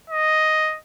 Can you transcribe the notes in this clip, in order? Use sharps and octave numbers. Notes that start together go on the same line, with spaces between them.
D#5